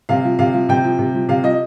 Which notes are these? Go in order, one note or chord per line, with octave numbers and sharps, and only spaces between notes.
C3 F5
F3
C3 F5
F3
C3 G5
F3
C3
F3
C3 F5
F3 D#5